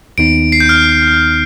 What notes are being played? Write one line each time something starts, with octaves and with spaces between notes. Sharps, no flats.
D#2 D#3 B3 D#4 D7
C7
G6
F6